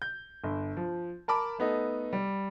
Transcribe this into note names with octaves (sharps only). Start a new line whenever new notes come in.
G6
G1
F3
A#4 A5 B5 D6
A3 B3 D#4 A4
G3